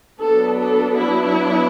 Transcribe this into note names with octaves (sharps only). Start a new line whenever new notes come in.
F#3 B3 D4 A4
A4
E4